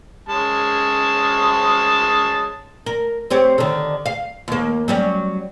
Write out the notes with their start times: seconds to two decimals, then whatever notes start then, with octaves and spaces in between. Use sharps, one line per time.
0.29 G#3 C#4 A5
2.86 A#4
3.30 C4 G4 C#5
3.58 D3 D#3
4.06 F5
4.48 D#2 A#3
4.88 F#3 G3 C#4